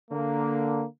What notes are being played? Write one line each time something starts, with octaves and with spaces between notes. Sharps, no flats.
D3 A#3